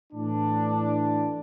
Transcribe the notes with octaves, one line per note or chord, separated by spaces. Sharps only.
A2 E3 A3 D4